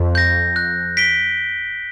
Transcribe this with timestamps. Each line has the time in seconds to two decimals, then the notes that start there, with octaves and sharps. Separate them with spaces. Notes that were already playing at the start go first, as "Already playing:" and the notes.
Already playing: F2
0.15 G6 A#6
0.56 F#6
0.97 B6 D7 G7